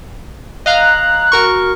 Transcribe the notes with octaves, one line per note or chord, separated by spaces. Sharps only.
D#5 F5 A#5 F#6
F#4 A#4 C#6